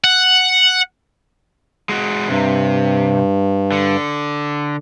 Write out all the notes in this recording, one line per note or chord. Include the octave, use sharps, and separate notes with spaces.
F#5
G#3 F#4
G2 C3
D3